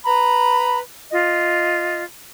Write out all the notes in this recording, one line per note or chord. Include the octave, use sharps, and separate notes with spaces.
B4 A#5 B5
F4 D#5